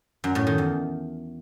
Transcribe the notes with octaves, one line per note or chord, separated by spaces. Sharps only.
F#2
A2
D#3
E2